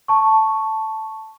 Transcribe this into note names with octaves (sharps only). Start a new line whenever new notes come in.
A5 C#6